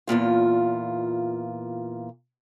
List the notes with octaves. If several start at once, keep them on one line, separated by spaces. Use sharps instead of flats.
E2 G2 A#2 F4